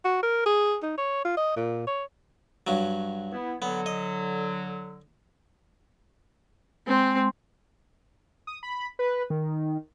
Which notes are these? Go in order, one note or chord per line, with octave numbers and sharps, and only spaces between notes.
F#4
A#4
G#4
D#4
C#5
F4
D#5
A#2
C#5
G2 F#3
B3 E4
D3 F#3 B3
D#5
G#3 C4 C6
D#6
B5
B4
D#3